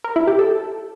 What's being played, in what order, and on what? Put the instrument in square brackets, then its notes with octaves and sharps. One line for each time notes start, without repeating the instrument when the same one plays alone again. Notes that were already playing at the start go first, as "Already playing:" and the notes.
[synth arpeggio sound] A#4
E4
G4
A4